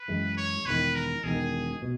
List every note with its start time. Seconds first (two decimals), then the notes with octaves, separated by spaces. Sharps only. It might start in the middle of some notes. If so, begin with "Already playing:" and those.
Already playing: B4
0.08 F#2 E3 G#3
0.37 C#5
0.66 E1 E2 D#3 B4
0.95 A#4
1.24 E1 E2 D#3 G#4
1.82 B2